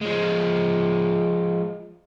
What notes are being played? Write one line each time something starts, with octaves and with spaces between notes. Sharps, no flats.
F3 G#3